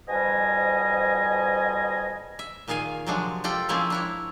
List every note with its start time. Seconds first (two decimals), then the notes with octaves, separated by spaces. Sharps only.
0.08 F2 G#2 B2 G3 D#5 G#5
2.39 E5
2.68 A#2 D#3 G#4 F5 G#5
3.06 C3 F3 F#3 G#3 D4
3.44 F4 G4 A4 G5
3.69 F3 G#3 A#3 C4 C#4 E4
3.90 D4 E4 C#5